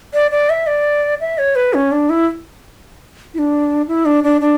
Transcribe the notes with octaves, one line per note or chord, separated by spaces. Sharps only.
D5
D5
E5
D5
E5
C#5
B4
C#4
D4
E4
E4
D4
E4
D4
D4
D4